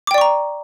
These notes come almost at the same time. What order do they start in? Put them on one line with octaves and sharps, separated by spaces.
D6 G5 D5 C#6 A#5